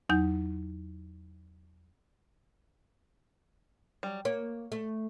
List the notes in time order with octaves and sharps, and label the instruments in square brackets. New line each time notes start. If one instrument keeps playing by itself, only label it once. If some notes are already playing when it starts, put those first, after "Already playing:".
[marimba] E2 F#3 D#4 G6
[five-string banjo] F#3 G3
[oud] A#3 [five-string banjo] C#5
[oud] A3